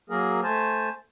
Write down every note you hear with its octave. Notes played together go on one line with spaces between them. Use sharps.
F#3 A#3 G#4 A#4
A3 C5 G#5 A5